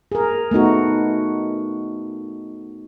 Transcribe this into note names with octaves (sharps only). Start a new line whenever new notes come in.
G#4 A#4
A3 B3 D#4 F#4